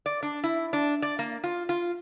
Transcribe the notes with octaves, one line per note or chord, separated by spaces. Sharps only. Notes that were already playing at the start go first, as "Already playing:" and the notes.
D5
D4
E4
D4
D5
A#3
F4
F4